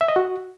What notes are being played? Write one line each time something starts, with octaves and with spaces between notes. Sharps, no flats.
E5
D#5
F#4